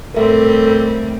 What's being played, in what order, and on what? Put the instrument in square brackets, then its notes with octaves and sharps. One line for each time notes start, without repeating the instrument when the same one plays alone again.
[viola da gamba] A2 G3 C4 [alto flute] A4 [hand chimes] A#4 E5